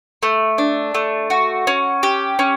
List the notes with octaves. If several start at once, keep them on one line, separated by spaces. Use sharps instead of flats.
A3
D4
A3
F#4
C#4
G4
C#4